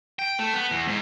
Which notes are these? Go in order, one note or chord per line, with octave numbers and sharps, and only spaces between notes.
G5
A3
B3
E2
G#2